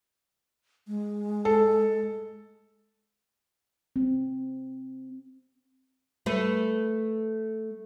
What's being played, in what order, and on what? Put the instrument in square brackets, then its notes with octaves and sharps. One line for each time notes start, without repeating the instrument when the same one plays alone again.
[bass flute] G#3
[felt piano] A4
[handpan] C4
[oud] A3 B4